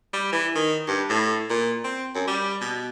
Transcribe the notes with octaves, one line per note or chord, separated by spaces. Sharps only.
G3
E3
D#3
G2
A2
A#2
C4
F#2
G3
B2